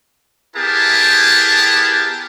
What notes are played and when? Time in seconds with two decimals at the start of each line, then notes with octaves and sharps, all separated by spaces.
0.56 B3 E4 G4 G#4 A#4 A5